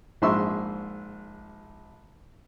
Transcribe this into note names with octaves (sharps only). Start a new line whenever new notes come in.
A#1 G#2 E5 C6 C#6 E6